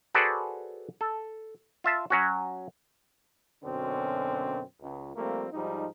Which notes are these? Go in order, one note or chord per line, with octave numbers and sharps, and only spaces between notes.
F#4 G#4 A4 B4 C5 D5
A4
F4 E5 A5
F#3 C#4 F#4
F#2 B2 D3 C4 C#4
C#2
F3 G3 A3 A#3 C4
G#2 F3 G3 D#4